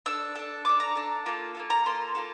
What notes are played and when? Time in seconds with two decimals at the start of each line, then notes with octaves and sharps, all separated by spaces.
0.06 D4 A4 E6
0.35 D4 A4
0.65 D4 A4 D6
0.80 A#5
0.95 D4 A4
1.26 A#3 F4 A4
1.55 A#3 F4 A4
1.70 A#5
1.85 A#3 F4 A4 C6
2.15 A#3 F4 A4